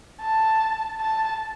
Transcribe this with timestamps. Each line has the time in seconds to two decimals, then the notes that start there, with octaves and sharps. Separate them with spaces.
0.21 A5
1.00 A5